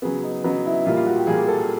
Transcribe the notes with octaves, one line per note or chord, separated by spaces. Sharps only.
C#3 F#3 B3 G#4
D#4
C#3 F#3 B3 D#4
E4
A#2 G3 A#3 F4
F4
F#4
G4
A#2 G3 A#3 G#4
A4